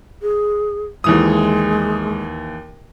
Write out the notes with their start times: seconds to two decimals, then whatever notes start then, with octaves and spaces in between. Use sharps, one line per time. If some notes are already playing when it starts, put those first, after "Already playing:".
0.22 G#4
1.04 D#2 E3 G#3 D#6